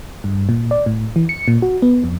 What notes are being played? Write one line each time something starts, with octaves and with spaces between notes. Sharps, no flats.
G2
A#2
D5
A2
E3
C#7
A#2
F#4
B3
F2